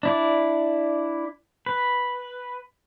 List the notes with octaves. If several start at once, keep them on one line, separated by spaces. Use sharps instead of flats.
D4 E4 D5
B4